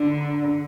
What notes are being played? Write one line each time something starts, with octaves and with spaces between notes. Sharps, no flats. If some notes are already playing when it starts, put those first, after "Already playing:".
Already playing: D3